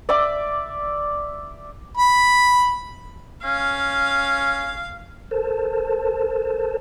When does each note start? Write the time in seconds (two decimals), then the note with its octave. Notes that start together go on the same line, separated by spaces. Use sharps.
0.09 D5 E5 D6
1.97 B5
3.44 C#4 F5
5.31 A4 A#4 C5 A5